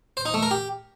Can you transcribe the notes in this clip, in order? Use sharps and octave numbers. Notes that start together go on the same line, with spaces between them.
C5
D#4
A3
A#4
G4